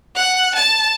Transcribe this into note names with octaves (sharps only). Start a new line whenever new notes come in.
F#5
A5